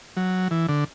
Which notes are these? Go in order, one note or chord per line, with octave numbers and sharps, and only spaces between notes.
F#3
E3
D3